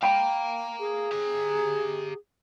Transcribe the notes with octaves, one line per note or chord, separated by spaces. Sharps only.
F5 G5 A#5 B5
G#4
G4 A#5